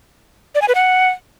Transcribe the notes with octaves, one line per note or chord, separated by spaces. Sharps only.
D5
G#5
B4
F#5